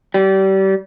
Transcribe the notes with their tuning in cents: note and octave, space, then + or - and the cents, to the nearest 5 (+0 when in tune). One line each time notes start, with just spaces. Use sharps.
G3 -30